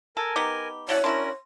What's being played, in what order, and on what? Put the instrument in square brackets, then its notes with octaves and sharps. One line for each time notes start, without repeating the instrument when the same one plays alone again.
[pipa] A4 [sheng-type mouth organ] A#4 G#5
[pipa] B3 D#4 G4 [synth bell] D6
[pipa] F#3 E4 F#5 [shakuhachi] C#5 [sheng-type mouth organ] D5 A5
[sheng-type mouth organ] C#4 A#4 [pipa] D4 E4 F#4 [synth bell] C6